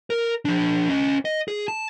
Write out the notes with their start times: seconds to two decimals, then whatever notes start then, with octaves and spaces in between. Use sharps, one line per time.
0.10 A#4
0.45 F3 D4
0.89 C#4 D#5
1.25 D#5
1.48 G#4
1.68 A5